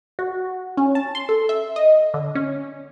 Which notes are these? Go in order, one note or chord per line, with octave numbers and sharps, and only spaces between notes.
F#4
C#4
A5
C6
A4
E5
D#5
D3
C#4